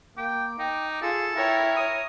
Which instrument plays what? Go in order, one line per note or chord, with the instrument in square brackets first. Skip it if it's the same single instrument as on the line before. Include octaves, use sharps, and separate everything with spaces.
[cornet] A#3 [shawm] G5 [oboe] D6
[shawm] D#4 [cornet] G5
[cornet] F4 [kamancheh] G#4 [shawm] A4
[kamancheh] E4 C#5 [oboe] A#4 [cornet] G5
[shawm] D#6